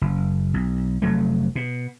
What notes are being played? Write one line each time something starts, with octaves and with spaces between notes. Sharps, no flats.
F#1
B1
F1 F#3 A3
B2